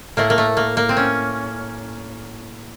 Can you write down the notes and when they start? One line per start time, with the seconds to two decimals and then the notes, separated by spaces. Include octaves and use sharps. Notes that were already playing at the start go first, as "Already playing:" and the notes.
0.17 A2 A3 A#3
0.30 A#3
0.38 A3
0.57 A#3
0.77 A#3
0.89 C4
0.97 C#4